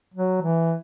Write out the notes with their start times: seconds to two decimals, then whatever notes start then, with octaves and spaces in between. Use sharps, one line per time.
0.14 F#3
0.42 E3